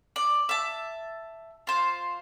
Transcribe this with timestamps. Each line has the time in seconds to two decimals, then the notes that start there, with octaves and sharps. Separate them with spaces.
0.16 D5
0.49 E5 A5
1.67 F4 C5